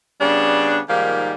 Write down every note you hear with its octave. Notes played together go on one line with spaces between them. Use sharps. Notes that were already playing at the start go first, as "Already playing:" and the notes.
C#3 G3 B3 D4
G#2 D#3 F3 G3 A#3